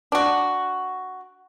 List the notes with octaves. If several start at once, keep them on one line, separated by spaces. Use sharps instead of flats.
D4 F#4